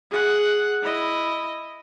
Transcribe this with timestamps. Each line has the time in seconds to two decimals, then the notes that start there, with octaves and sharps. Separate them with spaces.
0.11 G#4 F#5
0.82 E4 D#5